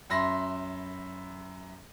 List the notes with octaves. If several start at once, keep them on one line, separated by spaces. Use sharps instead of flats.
F#2 E5 B5 C6 A#6